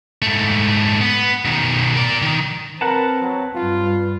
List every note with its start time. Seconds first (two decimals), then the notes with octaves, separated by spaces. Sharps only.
0.22 G#2 A3
1.01 B3
1.45 B2 D#3
1.97 A#4 D5
2.22 D#3
2.81 C4 A#4 B4 F#5 A5
3.21 F#3
3.56 G2 F4